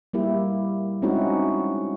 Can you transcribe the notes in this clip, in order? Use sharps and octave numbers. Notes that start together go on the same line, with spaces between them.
G3 A#3 E4 G4
G#3 C4 C#4 D#4 E4 F#4